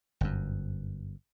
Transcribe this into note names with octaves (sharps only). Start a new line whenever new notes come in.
G1 F#2